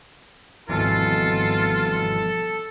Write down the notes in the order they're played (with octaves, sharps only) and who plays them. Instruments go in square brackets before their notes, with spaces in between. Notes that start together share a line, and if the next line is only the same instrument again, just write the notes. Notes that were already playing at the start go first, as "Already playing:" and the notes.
[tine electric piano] G#1 B2 E3 [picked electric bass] F3 G3 B3 [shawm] F4 [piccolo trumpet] A4